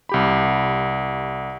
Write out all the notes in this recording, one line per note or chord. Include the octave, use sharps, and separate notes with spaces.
C2 G4 B5